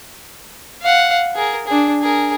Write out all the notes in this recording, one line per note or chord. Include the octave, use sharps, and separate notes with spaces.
F5 F#5
G#4 A#4
D4 G#4
G#4 A#4